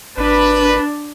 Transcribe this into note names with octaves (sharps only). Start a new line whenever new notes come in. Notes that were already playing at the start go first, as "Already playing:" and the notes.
G#1 D4 B4